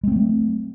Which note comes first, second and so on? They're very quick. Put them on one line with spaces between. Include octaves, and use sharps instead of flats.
G#3 C4 A3 F#3